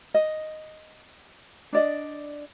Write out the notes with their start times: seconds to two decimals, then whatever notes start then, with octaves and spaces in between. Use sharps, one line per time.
0.14 D#5
1.73 D4 D5 D#5